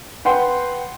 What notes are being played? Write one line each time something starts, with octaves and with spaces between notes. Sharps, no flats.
B4 F#5 G5 C6